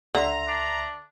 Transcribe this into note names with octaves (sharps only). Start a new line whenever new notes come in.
C#2 D3 E5 A#5 C6
D4